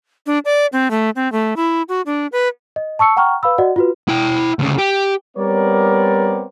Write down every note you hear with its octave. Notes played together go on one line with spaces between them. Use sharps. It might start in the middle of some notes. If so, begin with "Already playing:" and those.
D4
D5
C4
A3
C4
A3
E4
F#4
D4
B4
D#5
A5 C#6 E6 C#7
F#5 G5 A#5 C#6 F6
B4 F5 B5 E6
F#4 D5 D#5 F#5
F4 F#4 B4
E4 G5
D2 C#3
G4
G3 B3 C4 A#4 C#5 D5